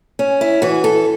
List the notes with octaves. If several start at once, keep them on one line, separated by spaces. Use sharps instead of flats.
C#4
E4
E3 F#4
A4